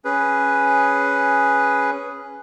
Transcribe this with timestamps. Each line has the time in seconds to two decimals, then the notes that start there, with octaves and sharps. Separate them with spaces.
0.05 C#4 G#4 B4